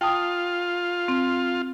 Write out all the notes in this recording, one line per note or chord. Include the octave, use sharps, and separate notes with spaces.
F4 G5 A5 D#6
C4